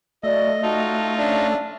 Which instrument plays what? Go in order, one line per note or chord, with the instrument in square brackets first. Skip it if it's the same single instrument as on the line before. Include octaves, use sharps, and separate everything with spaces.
[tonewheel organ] A3 [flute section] F#4 D5 [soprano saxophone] D#5
[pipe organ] D#4 F4 [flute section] F#4 A5
[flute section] C#4 E5 [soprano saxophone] D4